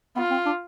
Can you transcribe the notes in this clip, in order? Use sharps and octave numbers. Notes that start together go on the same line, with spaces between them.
B3 F4
C4
D4